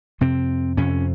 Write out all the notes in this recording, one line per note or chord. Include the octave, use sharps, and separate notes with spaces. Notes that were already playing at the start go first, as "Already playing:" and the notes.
F2 C3 C4
F2 C3 C#4